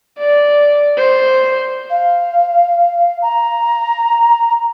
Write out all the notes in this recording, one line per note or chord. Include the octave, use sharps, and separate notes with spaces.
D5
C5
F5
A#5